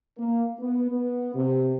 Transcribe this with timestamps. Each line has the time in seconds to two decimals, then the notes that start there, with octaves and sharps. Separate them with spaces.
0.18 A#3
0.59 B3
0.91 B3
1.35 C3